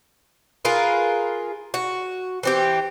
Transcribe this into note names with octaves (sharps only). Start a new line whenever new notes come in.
F4 G#4 A#4 B4
F#4
E3 C4 G4